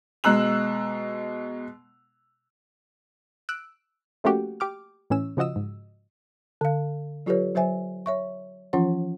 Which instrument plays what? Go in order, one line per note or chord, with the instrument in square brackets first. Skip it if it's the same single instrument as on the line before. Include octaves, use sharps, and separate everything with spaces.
[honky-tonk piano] B2 G#3 A#5 E6 F#6 F#7
[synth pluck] E6 F#6 D7
F3 A3 A#3 C#4 F#4 G4
G4 D6 F6
A2 E3 C#4 E6
C#3 F3 F#4 D#5 E6
G#2
[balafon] D3 F5
F#3 F4 G4 A4 B4 C#5
F#3 C5 E5 G#5
C#5 E5 C#6
E3 F3 C#4 F4 F#5